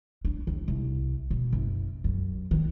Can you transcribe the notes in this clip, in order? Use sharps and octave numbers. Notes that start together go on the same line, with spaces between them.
D4
D#2
C2
B2
F#1
F#2
D#3